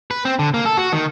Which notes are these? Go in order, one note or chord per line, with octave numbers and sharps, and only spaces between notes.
B4
C4
D3
A#3
A4
F#4
D#3